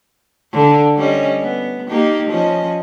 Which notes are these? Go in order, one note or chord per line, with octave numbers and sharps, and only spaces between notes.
D3
G3 C#4 D#5
B3
A#3 D#4 G4
F3 C#4 D#5